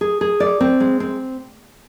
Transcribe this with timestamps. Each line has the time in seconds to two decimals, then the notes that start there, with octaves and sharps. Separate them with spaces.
0.01 G#4
0.21 G#4
0.40 D5
0.61 C4
0.80 G#3
1.00 C4